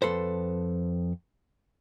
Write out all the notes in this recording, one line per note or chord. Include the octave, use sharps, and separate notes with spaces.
F2 A4 B4 C5